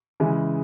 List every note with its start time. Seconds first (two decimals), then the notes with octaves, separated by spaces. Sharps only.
0.20 C#3 E3 G#3